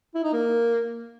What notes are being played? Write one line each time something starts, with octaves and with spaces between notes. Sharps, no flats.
E4
D#4
A#3